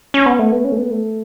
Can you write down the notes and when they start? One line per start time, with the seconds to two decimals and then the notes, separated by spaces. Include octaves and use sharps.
0.14 C#4
0.26 B3
0.39 A3
0.52 B3
0.65 C#4
0.72 A3
0.78 B3
0.91 A3